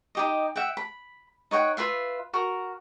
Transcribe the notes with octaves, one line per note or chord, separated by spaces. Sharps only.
D#4 G4 D#5
E5 F#5 G5
B5
D#4 C#5 F#5 G5
F4 B4 E5 F5
F#4 A#4